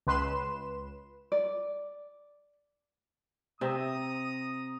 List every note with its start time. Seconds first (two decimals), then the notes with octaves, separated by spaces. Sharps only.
0.07 C#2 B4 C6 E7
1.32 D5
3.61 C3 C4 E5 A#5 D#6